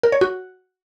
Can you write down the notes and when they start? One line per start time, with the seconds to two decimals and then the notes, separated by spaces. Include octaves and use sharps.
0.03 A#4
0.12 C#5
0.21 F#4